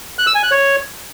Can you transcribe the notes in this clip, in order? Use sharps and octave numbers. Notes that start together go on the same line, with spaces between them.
F#6
E6
G#5
F#6
C#5